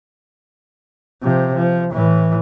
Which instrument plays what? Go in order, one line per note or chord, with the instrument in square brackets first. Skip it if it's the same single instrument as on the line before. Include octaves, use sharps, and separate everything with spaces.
[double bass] C3 F3
F3
A2 E3